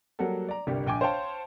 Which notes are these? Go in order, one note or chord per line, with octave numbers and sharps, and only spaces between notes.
F#3 G3 A#3 F#4 A4
D5 A#5
G1 C2 G3 G4 A#4
A#1 G5 G#5 D6
C5 C#5 F5 G5 A5